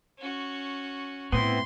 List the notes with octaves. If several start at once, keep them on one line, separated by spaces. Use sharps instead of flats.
C#4 F#4
A2 B3 C4 E4 C6